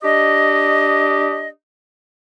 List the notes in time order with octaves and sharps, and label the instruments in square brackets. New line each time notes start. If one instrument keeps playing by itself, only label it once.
[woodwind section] D4 G4 D#5